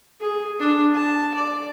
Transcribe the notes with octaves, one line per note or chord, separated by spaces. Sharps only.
G#4
D4
A5
D5